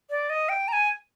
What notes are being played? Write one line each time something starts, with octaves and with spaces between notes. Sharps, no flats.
D5
D#5
G5
A#5
G#5